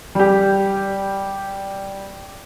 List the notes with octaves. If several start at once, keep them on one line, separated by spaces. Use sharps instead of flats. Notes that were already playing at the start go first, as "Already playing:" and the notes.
G3 G4